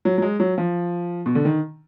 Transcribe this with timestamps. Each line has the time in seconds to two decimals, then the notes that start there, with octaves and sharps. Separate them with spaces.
0.05 F#3
0.18 F#3
0.22 G#3
0.40 F#3
0.58 F3
1.26 B2
1.35 D3
1.45 D#3